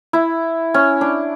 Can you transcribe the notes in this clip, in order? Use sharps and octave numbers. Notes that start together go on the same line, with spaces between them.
E4
C#4
D4